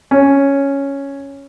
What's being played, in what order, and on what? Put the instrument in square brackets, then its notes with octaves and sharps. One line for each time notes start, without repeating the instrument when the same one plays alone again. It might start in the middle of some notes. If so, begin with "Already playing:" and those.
[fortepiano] C#4